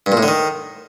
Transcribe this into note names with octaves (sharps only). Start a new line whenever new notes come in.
G2
A#2
A2
D3
D#3